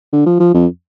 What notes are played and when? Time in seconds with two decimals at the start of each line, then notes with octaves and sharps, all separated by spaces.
0.13 D3
0.26 F3
0.40 F3
0.54 F2